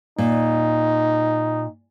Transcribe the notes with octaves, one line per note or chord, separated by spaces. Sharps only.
A#2 D#4